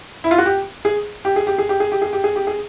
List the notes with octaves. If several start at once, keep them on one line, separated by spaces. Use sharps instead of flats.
E4
F4
F#4
G4
G#4
G4
G#4
G4
G#4
G4
G#4
G4
G#4
G4
G#4
G4
G#4